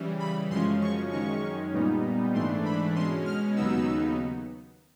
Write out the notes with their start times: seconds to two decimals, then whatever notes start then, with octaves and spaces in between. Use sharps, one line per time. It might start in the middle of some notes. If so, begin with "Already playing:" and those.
Already playing: C#3 E3 G3
0.20 B5
0.50 F#2 C#3 F3 G#3 C#4 C6
0.81 C#6
1.11 F#2 D#3 G#3 C#4 C#6
1.73 A#2 G3 B3 D#4
2.34 G#2 E3 A3 D4 C6
2.65 B5
2.95 B2 G#3 C#4 C6
3.26 F6
3.56 D#2 C#3 F#3 B3 D#4 E6